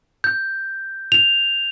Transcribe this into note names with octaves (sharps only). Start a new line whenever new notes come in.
G6
F7